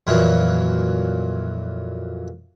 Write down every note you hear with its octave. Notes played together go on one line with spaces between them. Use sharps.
F2 A#2 E3 F#3